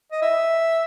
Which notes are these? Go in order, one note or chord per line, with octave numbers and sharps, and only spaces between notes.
D#5
E5